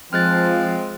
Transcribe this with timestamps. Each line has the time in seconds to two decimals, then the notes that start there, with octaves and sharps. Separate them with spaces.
0.13 F3 G#3 C4 F6 F#6 A6